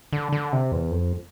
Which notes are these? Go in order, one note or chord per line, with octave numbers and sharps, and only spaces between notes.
D3
D3
C3
E2
F2